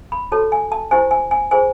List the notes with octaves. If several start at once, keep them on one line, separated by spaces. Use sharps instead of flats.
B5
F#4 A4 C#5 A5
G#5
A5
E4 G4 C5 G#5
G#5
G#5
F4 G#4 C5 G#5